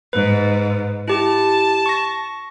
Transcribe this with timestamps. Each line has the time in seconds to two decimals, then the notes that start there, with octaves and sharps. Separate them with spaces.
0.13 G#2 B4
1.08 E4 G4 A5
1.86 C#6 A#6